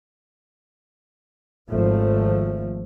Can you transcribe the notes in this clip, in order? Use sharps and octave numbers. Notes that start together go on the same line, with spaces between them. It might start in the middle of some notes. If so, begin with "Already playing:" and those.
G#1 F3 A3